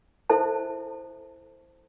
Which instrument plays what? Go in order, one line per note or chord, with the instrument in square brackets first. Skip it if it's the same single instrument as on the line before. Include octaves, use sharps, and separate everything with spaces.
[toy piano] E4 A4 C5 E5 A5